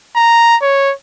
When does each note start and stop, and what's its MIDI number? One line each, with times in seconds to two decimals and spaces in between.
0.16 0.56 82
0.62 0.92 73